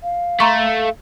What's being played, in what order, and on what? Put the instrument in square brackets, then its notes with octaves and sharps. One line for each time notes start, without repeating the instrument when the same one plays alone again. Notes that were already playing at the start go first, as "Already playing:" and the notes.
[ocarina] F5
[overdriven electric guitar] A3 [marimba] A#5 C6 C#6